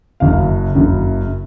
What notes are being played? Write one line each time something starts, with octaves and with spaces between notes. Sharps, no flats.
F#1 F#2 C#3 F5
F#1 F#2 C#3